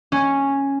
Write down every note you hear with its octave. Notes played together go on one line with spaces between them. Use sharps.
C#4